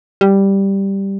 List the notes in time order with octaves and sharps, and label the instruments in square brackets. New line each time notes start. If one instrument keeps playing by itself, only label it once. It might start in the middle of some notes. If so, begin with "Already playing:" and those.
[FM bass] G3